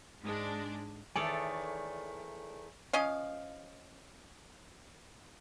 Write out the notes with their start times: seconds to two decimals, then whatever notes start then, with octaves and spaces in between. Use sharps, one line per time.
0.22 G#2 G#3 D4
1.16 E2 D#3 A3 A4 C#5 D5 G#5 D#6
2.93 F3 C#4 D#5 F5